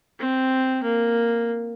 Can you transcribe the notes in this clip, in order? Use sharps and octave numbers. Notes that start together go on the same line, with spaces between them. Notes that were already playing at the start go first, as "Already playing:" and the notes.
C4
A#3